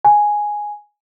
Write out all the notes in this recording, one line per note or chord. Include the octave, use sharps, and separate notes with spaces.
G#5